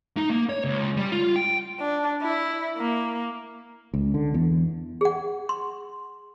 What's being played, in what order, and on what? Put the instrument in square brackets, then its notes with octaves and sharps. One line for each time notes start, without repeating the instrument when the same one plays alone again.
[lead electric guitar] D#4
A#3
C#5
C#2
G3
F4
G5
[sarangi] D4
E4
A#3
[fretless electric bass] C#2
D3
E2
[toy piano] G#4 F#5
C6